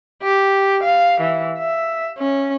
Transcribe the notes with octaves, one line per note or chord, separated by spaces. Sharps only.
G4
F5
E3
E5
C#4